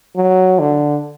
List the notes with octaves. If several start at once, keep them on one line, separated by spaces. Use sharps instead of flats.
F#3
D3